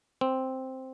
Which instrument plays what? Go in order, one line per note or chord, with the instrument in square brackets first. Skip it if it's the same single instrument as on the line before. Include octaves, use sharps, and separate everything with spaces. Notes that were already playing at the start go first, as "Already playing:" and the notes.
[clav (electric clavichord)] C4